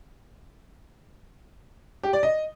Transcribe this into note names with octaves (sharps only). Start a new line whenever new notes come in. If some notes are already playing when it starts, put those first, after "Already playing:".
G4
D5
D#5